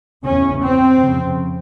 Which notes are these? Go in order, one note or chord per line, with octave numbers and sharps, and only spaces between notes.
E2 C#3 C#4
C4
F2 C#3